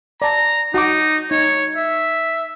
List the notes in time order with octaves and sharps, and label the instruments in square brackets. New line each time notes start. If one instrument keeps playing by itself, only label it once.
[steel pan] D5 A5 [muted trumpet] A#5
[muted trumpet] D#4 [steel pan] F#4 F#5 D6
[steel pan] D#4 [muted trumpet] C#5
[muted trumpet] E5